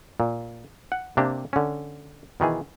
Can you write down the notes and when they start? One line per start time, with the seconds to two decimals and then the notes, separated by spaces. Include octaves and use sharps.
0.20 A#2
0.92 F#5
1.17 C3 A#3 D4 G4
1.53 D3 C#4
2.40 B2 D#3 E3 G#4